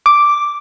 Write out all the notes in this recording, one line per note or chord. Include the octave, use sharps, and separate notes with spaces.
D6